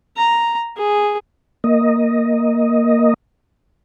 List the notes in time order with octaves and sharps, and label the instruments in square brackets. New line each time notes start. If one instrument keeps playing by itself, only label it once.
[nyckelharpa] A#5
G#4
[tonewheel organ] A#3 D#5